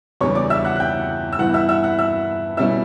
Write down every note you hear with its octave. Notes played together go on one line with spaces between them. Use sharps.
E2 C#3 E3 G3 D4 C#5 C#6
D5 D6
E5 E6
F#5 F#6
F#6
G5 G6
E6
G2 E3 B3 E4 F#5 F#6
E5 E6
E5 E6
F#5 F#6
E5 E6
B2 G3 C#4 E4 E5 E6